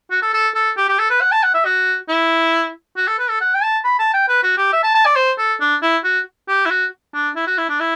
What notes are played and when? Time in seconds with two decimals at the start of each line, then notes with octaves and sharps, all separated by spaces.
0.11 F#4
0.22 A4
0.33 A4
0.55 A4
0.77 G4
0.88 G4
0.99 A4
1.10 B4
1.21 F#5
1.32 A5
1.43 F#5
1.54 E5
1.65 F#4
2.08 E4
2.97 F#4
3.08 A4
3.19 B4
3.30 A4
3.41 F#5
3.55 G5
3.63 A5
3.84 B5
3.99 A5
4.14 G5
4.28 B4
4.43 F#4
4.58 G4
4.73 E5
4.83 A5
4.94 A5
5.05 D5
5.16 C5
5.38 A4
5.60 D4
5.82 E4
6.04 F#4
6.48 G4
6.66 E4
6.70 F#4
7.14 D4
7.36 E4
7.47 F#4
7.58 E4
7.69 D4
7.80 E4